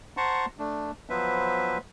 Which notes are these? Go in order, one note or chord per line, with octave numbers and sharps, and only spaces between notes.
C5 F#5 A5 A#5 C6 C#6
A3 D4
F3 F#3 B3 B4 C5 E5